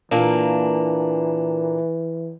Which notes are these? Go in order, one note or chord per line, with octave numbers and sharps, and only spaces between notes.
A#2 E3 A#3 D4